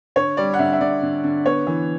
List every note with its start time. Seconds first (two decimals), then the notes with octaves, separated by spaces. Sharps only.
0.16 D3 C#5
0.37 G3 D5
0.54 F#5
0.59 D3 E5
0.73 E5
0.81 D3 D5
1.03 D3
1.24 D3
1.46 B3 C#5
1.67 E3